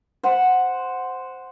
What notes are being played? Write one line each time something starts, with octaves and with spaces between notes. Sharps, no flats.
C5 F#5